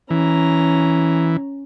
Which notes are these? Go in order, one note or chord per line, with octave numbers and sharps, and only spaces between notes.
E3 C#4 A#5